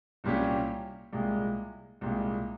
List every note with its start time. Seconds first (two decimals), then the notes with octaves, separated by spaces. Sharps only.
0.24 C2 A#2 G3 C#4 G4
1.12 C2 A#2 G#3
2.01 C2 A#2 G#3